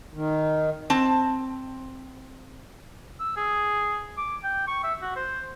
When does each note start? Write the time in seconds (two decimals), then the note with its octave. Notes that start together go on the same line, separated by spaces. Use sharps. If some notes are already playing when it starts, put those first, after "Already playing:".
0.14 D#3
0.90 C4 A5
3.20 E6
3.37 G#4
4.18 D6
4.44 G5
4.68 C#6
4.84 E5
5.02 F#4
5.16 C5